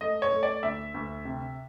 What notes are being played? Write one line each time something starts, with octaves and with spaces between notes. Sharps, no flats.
A3 D#5
C#5
A3
D5
D2 E5
D2
C3